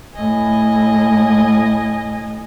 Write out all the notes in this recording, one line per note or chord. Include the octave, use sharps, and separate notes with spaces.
A2 D#5 G#5